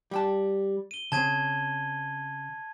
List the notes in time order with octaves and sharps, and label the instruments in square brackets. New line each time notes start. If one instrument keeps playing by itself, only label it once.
[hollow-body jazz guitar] G3 G5 A5
[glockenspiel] D#7 G7
[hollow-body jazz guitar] C#3 C4 [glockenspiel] A5 G#6 D#7